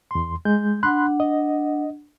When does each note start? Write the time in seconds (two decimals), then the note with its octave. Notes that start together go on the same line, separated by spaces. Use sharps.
0.11 E2 C6
0.45 G#3 G6
0.83 D4 F#5 B5 C6 F#6
1.20 D#5